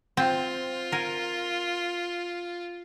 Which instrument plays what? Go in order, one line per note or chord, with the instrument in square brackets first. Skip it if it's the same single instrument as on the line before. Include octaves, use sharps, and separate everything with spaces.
[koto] C4 [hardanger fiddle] F4
[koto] A#4 G#5